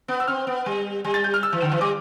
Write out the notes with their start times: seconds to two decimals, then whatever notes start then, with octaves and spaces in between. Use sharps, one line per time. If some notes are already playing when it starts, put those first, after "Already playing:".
0.08 B3
0.20 E6
0.27 C4 F6
0.47 B3
0.66 G3
1.04 G3
1.14 A6
1.24 G6
1.34 F6
1.43 E6
1.53 E3
1.62 D3
1.72 E3
1.81 G3 D6